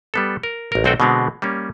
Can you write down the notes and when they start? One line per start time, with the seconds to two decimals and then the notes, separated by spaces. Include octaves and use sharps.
0.14 G3 B3 A4
0.43 A#4
0.72 A1 A#4
0.84 B1 A3 C4 F#4 A4 G5
1.00 B2 D3 G#3 B3 C4
1.42 G3 A#3 C#4